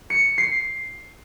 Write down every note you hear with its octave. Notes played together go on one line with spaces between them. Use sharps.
C#7
C7